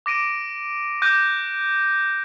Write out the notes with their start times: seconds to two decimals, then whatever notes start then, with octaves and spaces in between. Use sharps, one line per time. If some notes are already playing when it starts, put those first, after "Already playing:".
0.06 D6 A#6 D7 D#7
1.02 D6 F#6 G6 A#6 D#7